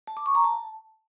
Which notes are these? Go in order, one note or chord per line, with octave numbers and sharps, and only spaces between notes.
A5
D6
C#6
A#5
A5